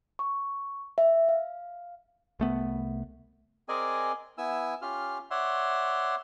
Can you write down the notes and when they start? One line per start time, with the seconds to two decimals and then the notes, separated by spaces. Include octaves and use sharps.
0.19 C#6
0.98 E5
1.29 F5
2.40 C2 A3 B3
3.69 C4 G#4 A#4 D5 D#5 G#5
4.38 B3 E4 G#5 E6
4.82 C#4 F4 G4 F6
5.31 C#5 D5 E5 F#5 C6